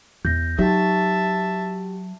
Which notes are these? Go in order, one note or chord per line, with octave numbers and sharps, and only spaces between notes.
E2 G6 A#6
F#3 D#4 F#4 G4 E5 A5